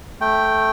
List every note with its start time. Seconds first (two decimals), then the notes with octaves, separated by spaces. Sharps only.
0.21 A3 G5